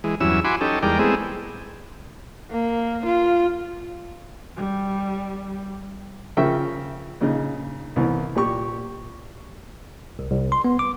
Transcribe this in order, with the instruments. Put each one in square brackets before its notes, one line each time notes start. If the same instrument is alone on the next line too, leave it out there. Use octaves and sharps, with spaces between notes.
[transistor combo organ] E3 G#3
E2 G2 F#3 C#4 E4 E6
E4 F#4 G#5 B5 C6 D6
C#4 D#4 G4 A4
E2 G3 G#3 A#4 D5 G5
G#3 A3 B3 C4 E4 G#4
[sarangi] A#3
F4
[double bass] G3
[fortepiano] C#3 F3 A#4 E5 G5 C#6
A#1 C#3 D#4
C2 E3 B3
A#2 G4 C#6
[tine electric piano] C2
C2
C6
B3
D6